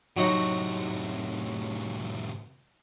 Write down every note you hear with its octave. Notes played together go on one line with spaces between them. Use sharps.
A2 C3 F#3 D#4 F#4